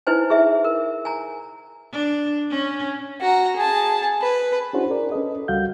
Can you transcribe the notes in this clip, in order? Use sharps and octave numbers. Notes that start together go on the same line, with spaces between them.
D#4 E4 B4 C5 G#5
G#4 E5
A#4
G#5 A#5
D4
C#4
F#4 A#5
G#4 A5
B4
C#4 D4 E4 F#4 G#4 C5
G#4 A#4 D5
C#4 A4 B4 D#5
C#2 G3 F#4 F5 G6